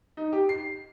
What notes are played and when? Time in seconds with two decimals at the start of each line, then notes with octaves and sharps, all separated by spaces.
0.17 D#4
0.33 G4
0.49 C7